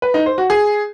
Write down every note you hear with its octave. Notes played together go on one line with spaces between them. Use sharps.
B4
D#4
C5
F#4
G#4